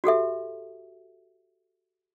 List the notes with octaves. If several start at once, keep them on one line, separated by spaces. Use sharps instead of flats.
F#4 G4 A4 E5